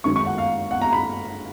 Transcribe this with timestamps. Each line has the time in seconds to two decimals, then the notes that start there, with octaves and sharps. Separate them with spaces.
0.04 F#2 D#3 G#3 C#6
0.16 C#6
0.26 F#5
0.38 F5
0.71 F#5
0.82 A#5
0.93 B5